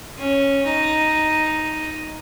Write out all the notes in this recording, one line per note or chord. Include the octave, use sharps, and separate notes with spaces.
C#4
D#4